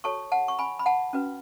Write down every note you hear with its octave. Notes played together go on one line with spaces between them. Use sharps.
F#4 A4 C#5 A5 C#6
F#5 A5
C#6
G#5 B5
B5
F#5 A5
C#4 F#4 B4